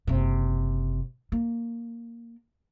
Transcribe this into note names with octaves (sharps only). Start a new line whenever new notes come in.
F#1 C3
A#3